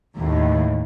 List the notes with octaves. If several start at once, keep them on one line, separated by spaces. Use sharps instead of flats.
D#2 A2